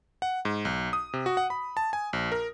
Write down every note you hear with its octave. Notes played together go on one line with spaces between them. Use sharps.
F#5
G#2
B1
D#6
C3
F#4
F#5
B5
A5
G#5
A#1
A#4